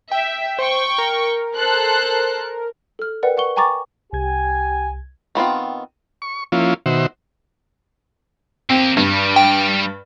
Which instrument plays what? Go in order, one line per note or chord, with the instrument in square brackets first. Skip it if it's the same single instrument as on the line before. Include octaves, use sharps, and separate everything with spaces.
[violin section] E5 [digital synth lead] G5
[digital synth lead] C5 [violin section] G5 C#6
[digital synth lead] A#4
[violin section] A4 C5 F#6
[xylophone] A4 F6
A#4 B4 D5 F#5 G5
B4 F#5 C#6 G7
G5 G#5 A#5 C#6 D6 A6
[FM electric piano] C2 G#6 [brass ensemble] G4 G#5
[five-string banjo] D#3 B3 C4 F4
[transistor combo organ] C#6
F3 A#3 C#4 E4 F4
B2 D#3 F#4 C5 E5
[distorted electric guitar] A#3 G4 [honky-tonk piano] C4
[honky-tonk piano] G2 [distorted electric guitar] G3
[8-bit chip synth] G5